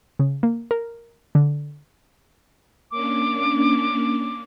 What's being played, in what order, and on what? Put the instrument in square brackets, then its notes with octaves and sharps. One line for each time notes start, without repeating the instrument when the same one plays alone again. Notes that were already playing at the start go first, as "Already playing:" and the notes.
[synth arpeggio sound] C#3
A#3
A#4
D3
[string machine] A#3 C#4 D4 [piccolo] D6